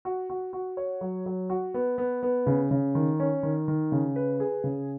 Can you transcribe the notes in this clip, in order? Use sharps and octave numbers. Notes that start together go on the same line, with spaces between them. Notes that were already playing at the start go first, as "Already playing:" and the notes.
F#4
F#4
F#4
C#5
F#3
F#3
F#4
B3
B3
B3
C#3
C#3
D#3
C#4
D#3
D#3
C#3
B4
G#4
C#3